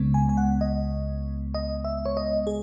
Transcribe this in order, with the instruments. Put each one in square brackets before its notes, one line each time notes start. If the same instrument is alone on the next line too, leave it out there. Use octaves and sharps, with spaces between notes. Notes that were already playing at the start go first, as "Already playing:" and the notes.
Already playing: [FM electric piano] C#2 C#3 G#3 B3
G#5
G#5
F#5
D#5
D#5
E5
C#5
D#5
G#4